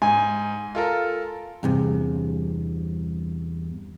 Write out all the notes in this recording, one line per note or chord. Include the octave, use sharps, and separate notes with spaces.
G#2 G#5
F4 A4 A#4
E2 G2 C3